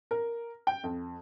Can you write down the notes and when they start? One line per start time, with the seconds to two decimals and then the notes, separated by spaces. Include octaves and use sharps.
0.11 A#4
0.67 G5
0.84 F2